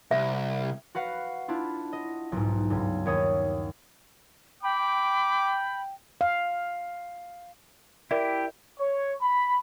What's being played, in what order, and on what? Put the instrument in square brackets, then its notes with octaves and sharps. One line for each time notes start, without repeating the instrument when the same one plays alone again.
[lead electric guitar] C2 [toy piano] E5
[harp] F#4 B4 F5 F#5
D4 E4 F4
D#5
B1 G#2
C#2 G2
D#2 C#5 D#6
[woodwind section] G5 [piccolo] B5 [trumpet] D6
[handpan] F5
[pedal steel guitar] E4 G4 [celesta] A#4 D5 E5
[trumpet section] C#5
B5